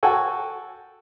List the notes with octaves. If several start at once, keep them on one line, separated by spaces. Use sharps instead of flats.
F#4 A4 G5 G#5